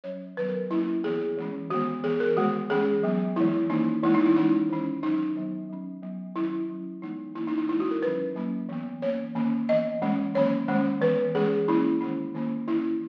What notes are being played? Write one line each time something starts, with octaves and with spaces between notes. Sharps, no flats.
F#3 C#4 C#5
D#3 F#3 B3 B4
A#4
F#3 A#3 C#4 E4
E3 B3 G#4
E3 G#3 C#4
D#3 G#3 B3 F#4
E3 B3 G#4
A#4
D#3 G#3 B3 F#4
E3 G#3 C#4 G#4
F#3 B3
E3 G#3 B3 E4
D#3 A#3 C#4 D#4
E3 G#3 B3 E4
D#4
E4
E3 G#3 C#4 D#4
D#3 G#3 C#4
D#3 F#3 C#4 D#4
D#3 F#3 B3
F#3 C#4
F#3 B3
D#3 F#3 C#4 E4
F#3 C#4
E3 G#3 B3 D#4
E3 A#3 C#4 E4
D#4
D#4
E3 G#3 C#4 E4
F#4
A#4
D#3 F#3 C#4 B4
F#3 A#3 C#4
E3 B3
E3 A#3 C#4 C#5
D#3 A#3 C#4
E3 B3 D#5
E3 G#3 C#4
D#3 F#3 A#3 C#4 C#5
D#3 G#3 C#4
E3 B3 B4
E3 G#3 C#4 G#4
E3 A#3 C#4 E4
D#3 G#3 C#4
D#3 A#3 C#4
E3 A#3 C#4 E4